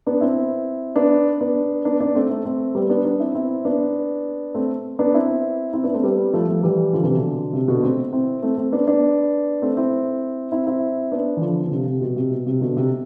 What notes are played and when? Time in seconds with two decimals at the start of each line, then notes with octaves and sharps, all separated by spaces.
0.06 B3 D4
0.21 C4 E4
0.96 B3 D4
1.41 B3 D4
1.85 B3 D4
2.00 B3 D4
2.15 A3 C4
2.30 A3 C4
2.45 A3 C4
2.75 G3 B3
2.90 B3 D4
3.05 B3 D4
3.20 C4 E4
3.35 C4 E4
3.65 B3 D4
4.54 A3 C4
4.99 B3 D4
5.14 C4 E4
5.73 C4 E4
5.84 B3 D4
5.94 A3 C4
6.03 G3 B3
6.33 F3 A3
6.49 F3 A3
6.63 E3 G3
6.93 D3 F3
7.04 C3 E3
7.13 B2 D3
7.53 C3
7.68 B2 D3
7.83 A3 C4
8.13 C4 E4
8.42 A3 C4
8.57 A3 C4
8.72 B3 D4
8.87 B3 D4
9.62 A3 C4
9.77 C4 E4
10.52 C4 E4
10.67 C4 E4
11.12 B3 D4
11.37 E3
11.41 D3 F3
11.66 D3
11.71 C3
11.87 C3
12.01 B2
12.16 C3
12.31 B2
12.46 C3
12.61 B2 D3
12.77 C3